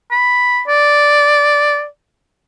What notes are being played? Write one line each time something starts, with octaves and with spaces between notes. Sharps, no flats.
B5
D5